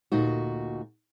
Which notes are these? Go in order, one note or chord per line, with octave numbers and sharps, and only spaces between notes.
D2 A#2 D#4 F#4